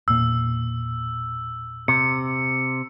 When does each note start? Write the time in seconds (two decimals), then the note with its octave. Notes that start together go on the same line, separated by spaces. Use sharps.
0.08 E1 A#2 E6
1.88 C3 C#7